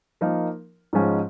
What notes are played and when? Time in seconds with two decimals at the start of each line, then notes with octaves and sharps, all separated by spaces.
0.21 F3 A#3 D#4 A#4
0.93 G#2 F3 G#3 C#4